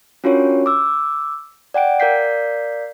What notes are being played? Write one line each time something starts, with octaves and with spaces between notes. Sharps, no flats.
C#4 D4 F4 F#4 A#4 C#5
D6 E6
D5 F#5 G5 D7
A#4 D5 F5 G6 B6 C7